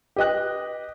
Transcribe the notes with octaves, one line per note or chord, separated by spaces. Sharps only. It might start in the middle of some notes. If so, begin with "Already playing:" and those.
G4 B4 D#5 G5 F#6